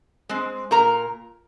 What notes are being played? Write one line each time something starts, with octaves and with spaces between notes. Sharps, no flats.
G#3 C4
A#2 A#4 A#5